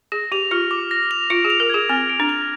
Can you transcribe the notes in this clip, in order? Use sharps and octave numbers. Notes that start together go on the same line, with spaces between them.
G#4 A#6
G4 F7
F4 F6
D6
A#6
F7
F4 D7
G#4
F7
A#4
G#4 G#6
C4 F6
D7
D4
F7